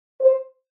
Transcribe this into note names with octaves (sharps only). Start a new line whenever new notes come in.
C5